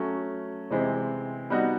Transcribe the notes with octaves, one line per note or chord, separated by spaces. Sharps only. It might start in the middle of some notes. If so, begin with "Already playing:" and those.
Already playing: F#3 A3 C#4
C3 E3 G#3 C4
G3 B3 D#4 F#4